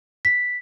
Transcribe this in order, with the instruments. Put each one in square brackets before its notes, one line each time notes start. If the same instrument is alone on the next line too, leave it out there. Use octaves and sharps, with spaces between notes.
[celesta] B6